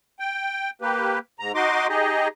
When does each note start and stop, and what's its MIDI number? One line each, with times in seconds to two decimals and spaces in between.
0.20 0.70 79
0.82 1.19 58
0.82 1.19 67
0.82 1.19 71
1.40 1.52 44
1.40 1.52 82
1.55 1.87 63
1.55 1.87 66
1.55 1.87 75
1.55 1.87 84
1.55 1.87 86
1.89 2.28 63
1.89 2.28 67
1.89 2.28 68
1.89 2.28 75